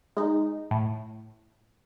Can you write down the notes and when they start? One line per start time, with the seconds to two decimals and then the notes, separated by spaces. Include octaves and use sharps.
0.17 G#3 D#4
0.71 A2